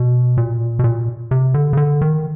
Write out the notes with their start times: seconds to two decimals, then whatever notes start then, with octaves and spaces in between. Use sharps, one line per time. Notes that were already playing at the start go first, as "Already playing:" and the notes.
Already playing: B2
0.37 A#2
0.79 B2
0.84 A#2
1.31 C3
1.54 D3
1.73 C#3
1.77 D3
2.01 D#3